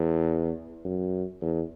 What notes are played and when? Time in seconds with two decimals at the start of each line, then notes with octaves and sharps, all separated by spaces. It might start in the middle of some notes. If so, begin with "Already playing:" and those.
Already playing: E2
0.84 F#2
1.42 E2